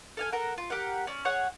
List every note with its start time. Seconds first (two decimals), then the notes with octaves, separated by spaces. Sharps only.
0.17 A4 F5 G#5
0.32 A4 A#4 F#5
0.58 F4
0.70 G4 A#4 F#5
1.07 C#4 D5
1.25 G#4 C#5 F#5